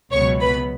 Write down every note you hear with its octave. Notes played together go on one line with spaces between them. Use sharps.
C#2 B2 F#3 B3 C#5 C#6
B4 B5